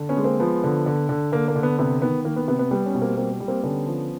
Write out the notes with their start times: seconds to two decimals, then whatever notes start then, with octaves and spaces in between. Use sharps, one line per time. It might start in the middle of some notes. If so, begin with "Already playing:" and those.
Already playing: D3
0.09 B3 C#4
0.17 G#3
0.24 A#3 C4
0.40 F3 B3
0.64 D3
0.86 D3
1.09 D3
1.32 D3 A#3
1.48 A#3
1.55 D3
1.63 B3
1.79 C3 B3
2.02 D#3 B3
2.25 D#3 A#3
2.36 B3
2.48 C3 B3
2.59 B3
2.71 G3 B3
2.86 B3 C#4
2.94 B2
3.01 A#3 C4
3.17 G3 A#3 C4
3.40 G3
3.48 A#3 C4
3.63 D3 B3 C#4
3.86 F3